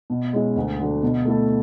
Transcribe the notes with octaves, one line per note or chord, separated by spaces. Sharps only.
B2
G#3 C#4 E4 G#4
D2
D3 F#3
B2
A3 E4 A4